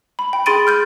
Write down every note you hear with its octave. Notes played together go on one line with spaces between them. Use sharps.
B5
G5
G#4 B5 C6 A6 D7 D#7
F6 G6 A6